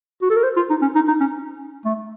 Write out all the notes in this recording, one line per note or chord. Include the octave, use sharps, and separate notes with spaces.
F#4
A4
A#4
C5
F4
D#4
C#4
D#4
D#4
C#4
A3